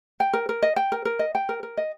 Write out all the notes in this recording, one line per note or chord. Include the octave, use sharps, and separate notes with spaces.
G5
A#4
A#4
D#5
G5
A#4
A#4
D#5
G5
A#4
A#4
D#5